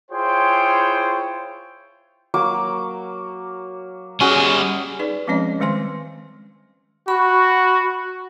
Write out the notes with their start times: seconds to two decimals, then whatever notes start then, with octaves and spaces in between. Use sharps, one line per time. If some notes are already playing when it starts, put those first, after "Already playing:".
0.10 E4 F4 G#4 C5 C#5 G5
2.34 F#3 A#3 D6
4.20 G3 C#4 F#4 G#4 G#5
4.99 D#4 G#4 B4 D5
5.28 F3 G#3 C4 C#4 C#5 D#5
5.60 D#3 G3 G#3 C5 G#5 C6
7.08 F#4 B5 C#6